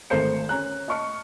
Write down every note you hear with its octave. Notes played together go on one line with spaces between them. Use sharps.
G#1 A3 A#4 C5 G6 C#7
C#4 A#5 F#6
D#5 A5 C#6 F6 C#7